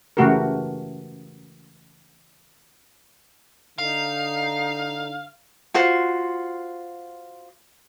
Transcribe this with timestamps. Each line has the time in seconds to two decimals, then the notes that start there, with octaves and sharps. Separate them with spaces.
0.17 C#3 E3 A3 F#4 G4 A#4
3.78 D3 D#4 F5
5.74 F4 F#4 C5